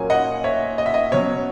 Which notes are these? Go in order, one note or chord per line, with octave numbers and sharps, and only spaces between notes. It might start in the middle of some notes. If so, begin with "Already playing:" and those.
Already playing: A#2 F#3 A#3 C#4 G#5
D#5 F#5
C#5 E5
D#5
E5
D#5
B2 F#3 C#4 C#5